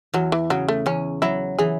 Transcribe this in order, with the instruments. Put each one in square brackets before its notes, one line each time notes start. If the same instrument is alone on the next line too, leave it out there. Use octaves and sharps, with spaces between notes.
[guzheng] E2 [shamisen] F#3
[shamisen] E3
[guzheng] C#3 [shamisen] F#3
[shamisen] A3
[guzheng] E2 [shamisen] C#4
[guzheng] F#3 [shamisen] E4
[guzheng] E3 [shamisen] G#4